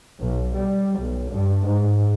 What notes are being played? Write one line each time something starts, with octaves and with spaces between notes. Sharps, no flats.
B1
G3
B1
G2
G#2